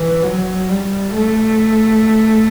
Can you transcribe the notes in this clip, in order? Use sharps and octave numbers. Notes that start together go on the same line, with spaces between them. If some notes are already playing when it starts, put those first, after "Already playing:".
Already playing: E3
F#3
G3
A3